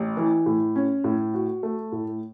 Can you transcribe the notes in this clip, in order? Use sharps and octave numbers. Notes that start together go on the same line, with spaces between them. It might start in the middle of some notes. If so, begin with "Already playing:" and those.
Already playing: A1
E3
A2
C#4
A2
F#4
A3
A2